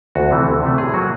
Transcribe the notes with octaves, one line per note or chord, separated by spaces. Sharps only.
D2 F#4
C3 E3 A3
D2
C3 E3 A3
A2 G#4
F#3 A#3 F#4